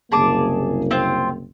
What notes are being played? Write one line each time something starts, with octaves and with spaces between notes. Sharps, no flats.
F#1 C2 A#3 G#4 A5 D6
C4 F4